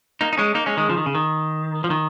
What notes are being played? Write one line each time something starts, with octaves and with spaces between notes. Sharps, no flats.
A#3 D#4
D#4
G#3 C#4
A#3 D#4
G#3 C#4
D#3 G#3
C#3 F3
D#3
C#3
D#3
F3
D#3